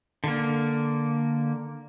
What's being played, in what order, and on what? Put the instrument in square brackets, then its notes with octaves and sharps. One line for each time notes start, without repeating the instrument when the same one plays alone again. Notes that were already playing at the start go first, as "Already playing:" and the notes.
[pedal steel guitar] D3 A#3